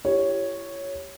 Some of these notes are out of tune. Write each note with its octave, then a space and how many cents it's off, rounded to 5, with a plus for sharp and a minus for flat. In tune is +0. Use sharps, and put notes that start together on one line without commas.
E4 +40 G4 +0 C#5 +0